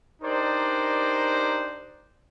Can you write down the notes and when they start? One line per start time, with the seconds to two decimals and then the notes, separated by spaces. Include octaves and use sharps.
0.22 D4 D#4 G4 A#4 C5 D5